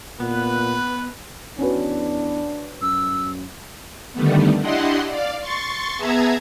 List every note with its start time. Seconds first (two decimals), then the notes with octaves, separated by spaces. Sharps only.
0.20 A#2 B3 B4
1.59 E2 C#4 D4 F#4 B4
2.82 F#2 E6
4.13 D3 D#3 G3 A3 B3
4.60 D4 E4 G4 D#5 F#5 C6
5.08 D5 F5
5.41 C6 C#6 A6
5.97 B3 G#4 E5 A5 A#5 G#6